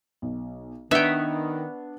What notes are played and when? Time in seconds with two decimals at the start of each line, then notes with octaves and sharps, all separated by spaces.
0.22 B1
0.91 D#3 B3 D4 C#5 E5 G5